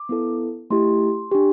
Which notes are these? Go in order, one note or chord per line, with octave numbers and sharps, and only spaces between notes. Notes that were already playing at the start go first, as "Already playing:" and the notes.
Already playing: D6
B3 E4 A4
A3 E4 G4 C6
D4 G4